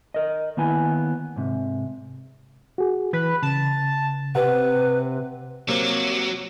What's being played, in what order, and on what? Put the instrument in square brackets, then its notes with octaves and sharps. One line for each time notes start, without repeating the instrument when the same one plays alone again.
[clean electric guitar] A#4 D#5
D#3 A#3 B3 E4 G#5
G#2 C3
[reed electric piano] F#4 G#4
[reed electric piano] E3 [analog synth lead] B4
[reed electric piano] C#3 [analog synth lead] A5
[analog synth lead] C3 [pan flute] B4 [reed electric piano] F#5
[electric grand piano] C3 A#3 C4 [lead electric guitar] F#3